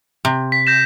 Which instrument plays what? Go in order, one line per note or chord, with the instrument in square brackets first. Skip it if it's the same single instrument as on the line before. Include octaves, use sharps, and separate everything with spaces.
[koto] C3
[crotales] B6
G6 A#6 E7